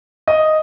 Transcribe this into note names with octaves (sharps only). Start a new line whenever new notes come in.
D#5